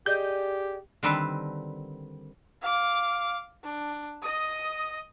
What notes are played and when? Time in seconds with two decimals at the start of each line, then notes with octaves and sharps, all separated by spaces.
0.06 G4 G#4 D5 D#5 G6
1.03 D3 D#3 G3 C4 A4 B4
2.62 F5 D6
3.64 D4
4.22 D#5 D#6